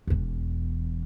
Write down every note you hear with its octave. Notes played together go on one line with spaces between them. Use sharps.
E1 E2